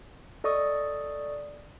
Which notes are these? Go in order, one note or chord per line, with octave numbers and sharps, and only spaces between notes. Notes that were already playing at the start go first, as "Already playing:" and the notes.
A4 D5 D#5 C#6 D#6